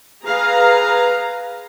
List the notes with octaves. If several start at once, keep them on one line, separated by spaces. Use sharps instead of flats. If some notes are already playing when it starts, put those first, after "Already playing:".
G#4 B4 F5 A#5